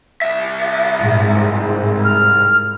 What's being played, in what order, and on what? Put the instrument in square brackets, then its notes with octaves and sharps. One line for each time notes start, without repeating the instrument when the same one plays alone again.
[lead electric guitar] C2 E5
[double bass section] G#2
[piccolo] F6